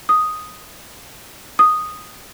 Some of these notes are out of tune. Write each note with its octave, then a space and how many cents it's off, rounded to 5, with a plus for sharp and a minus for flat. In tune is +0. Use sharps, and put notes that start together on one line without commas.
D#6 +0
D#6 -5